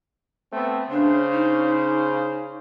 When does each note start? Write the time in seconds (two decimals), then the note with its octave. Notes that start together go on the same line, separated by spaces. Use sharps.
0.53 A3 B3 C4
0.91 C#3 C#4 D4 C5
1.33 D#4